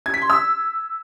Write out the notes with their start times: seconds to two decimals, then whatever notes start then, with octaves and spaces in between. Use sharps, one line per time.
0.06 G#6
0.14 B6
0.22 C6
0.30 E6